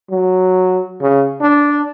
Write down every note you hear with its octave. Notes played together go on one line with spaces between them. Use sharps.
F#3
C#3
D4